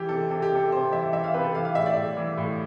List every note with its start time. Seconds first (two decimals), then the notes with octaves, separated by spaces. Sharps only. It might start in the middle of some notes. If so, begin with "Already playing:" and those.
Already playing: E3 G4
0.09 C3 A4
0.30 C3 A4
0.42 G4
0.51 C3 A4
0.72 C3 C5
0.92 E3 E5
1.13 E3 E5
1.24 F5
1.34 C3 B4
1.44 A4
1.55 E3 F5
1.65 F5
1.75 A2 E5
1.86 D5
1.97 A2
2.17 E3
2.37 A2